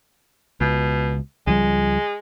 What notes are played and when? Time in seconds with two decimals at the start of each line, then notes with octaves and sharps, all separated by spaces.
0.61 C#2 B2
1.47 C#2 F3 G3 G#3